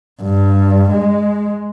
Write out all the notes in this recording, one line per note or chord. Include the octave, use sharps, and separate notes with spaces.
G2
G#3